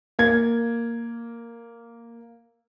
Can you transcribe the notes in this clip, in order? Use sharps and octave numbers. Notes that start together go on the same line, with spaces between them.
A#3 G#6